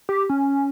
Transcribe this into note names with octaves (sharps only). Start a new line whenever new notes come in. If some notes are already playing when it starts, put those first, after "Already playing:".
G4
C#4